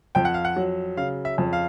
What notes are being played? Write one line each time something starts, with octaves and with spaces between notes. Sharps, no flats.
F2 G5
F#5
F5
F#5
F#3
C#3 F5
E5
F2
F5